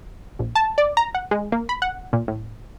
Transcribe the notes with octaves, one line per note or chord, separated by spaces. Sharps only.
A#1
A5
D5
A#5
F#5
G#3
A#3
B5
F#5
A#2
A2